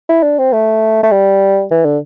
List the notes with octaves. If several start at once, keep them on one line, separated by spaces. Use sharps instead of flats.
E4
D4
C4
A3
A3
G3
E3
D3